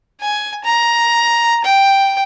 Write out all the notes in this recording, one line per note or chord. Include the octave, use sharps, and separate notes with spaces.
G#5
A#5
G5